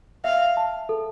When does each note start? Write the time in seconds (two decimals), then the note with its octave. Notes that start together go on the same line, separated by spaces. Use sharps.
0.24 E5 F5
0.57 A5
0.89 A4